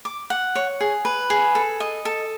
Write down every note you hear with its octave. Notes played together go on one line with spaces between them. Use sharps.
D6
F#5
C#5
G#4
B4
G#4
A4
D#5
A4